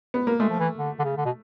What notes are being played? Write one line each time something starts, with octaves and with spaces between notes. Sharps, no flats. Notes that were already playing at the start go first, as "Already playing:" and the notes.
B3
A#3
G#3 A3
F3
E3
D3
D3
C#3
D3
B2